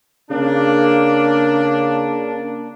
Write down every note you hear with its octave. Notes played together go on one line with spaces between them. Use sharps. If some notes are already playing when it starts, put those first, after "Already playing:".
C#3 A#3 D4